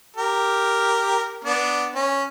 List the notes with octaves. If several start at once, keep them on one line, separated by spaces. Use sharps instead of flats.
G4 A#4
B3 D4
C#4